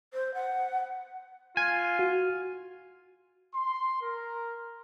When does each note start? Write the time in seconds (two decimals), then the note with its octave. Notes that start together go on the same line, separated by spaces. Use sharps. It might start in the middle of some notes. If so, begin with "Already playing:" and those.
0.14 C5
0.34 F#5
1.57 F4 G#5
1.99 F#4
3.55 C6
4.03 A#4